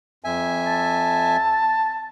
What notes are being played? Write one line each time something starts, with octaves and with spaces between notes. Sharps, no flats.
F2 E5 G#5
A5